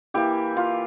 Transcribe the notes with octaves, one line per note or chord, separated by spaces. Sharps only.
E3 A#3 E4 G4
F4